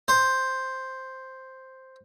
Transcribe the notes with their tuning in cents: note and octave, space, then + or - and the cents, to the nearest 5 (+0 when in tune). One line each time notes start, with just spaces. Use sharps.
C5 +0